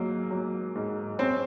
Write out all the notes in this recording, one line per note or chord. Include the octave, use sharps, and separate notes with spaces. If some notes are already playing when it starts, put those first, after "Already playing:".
Already playing: G#2 F#3 A#3
F#3
G#2
C4 C#4